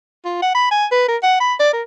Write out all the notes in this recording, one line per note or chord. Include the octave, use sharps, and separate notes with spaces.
F4
F#5
B5
G#5
B4
A#4
F#5
B5
D5
A#4